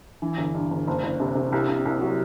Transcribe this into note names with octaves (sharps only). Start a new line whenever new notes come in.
E3
G1
G2
G1
F#1
F#1
C3
C3
C2
C2
C2
F#3